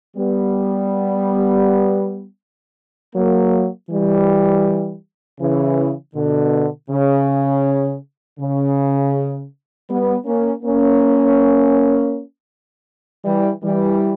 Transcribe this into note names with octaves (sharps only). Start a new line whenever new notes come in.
G3 B3
F#3 A#3
E3 G3
C#3 E3
B2 D3
C#3
C#3
G3 B3
A#3 C#4
A#3 C#4
E3 G3
E3 G3